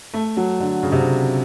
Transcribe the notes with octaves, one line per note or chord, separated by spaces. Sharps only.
A3
F#3
D3
C#3
C3
C#3